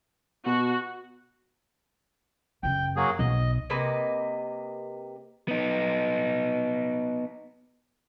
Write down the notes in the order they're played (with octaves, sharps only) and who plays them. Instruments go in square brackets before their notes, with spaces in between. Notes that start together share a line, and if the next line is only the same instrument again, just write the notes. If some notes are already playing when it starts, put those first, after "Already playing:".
[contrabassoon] B2 [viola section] F#4
[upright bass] F#2 C#3 [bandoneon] G5
[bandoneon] F#3 A#3 G#4
[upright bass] B1 B2 [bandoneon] D#5
[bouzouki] C3 A#3 B4 D#5
[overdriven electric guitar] B3 D#4